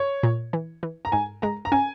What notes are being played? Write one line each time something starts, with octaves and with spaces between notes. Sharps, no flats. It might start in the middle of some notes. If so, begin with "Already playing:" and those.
Already playing: C#5
A#2
E3
E3
A#5
G#2 G#5
G#3 A#5
A#5
C#4 G#5